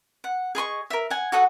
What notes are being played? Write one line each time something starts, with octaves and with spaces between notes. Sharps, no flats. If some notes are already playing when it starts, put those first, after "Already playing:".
F#5
G#4 D#5 C6 C#6
A#4 E5
F#5 G#5
F#4 A4 D#5 F#5